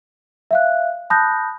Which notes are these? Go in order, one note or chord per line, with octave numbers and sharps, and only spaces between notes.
E5 F5 F#6
A5 B5 D#6 F#6 G6 A#6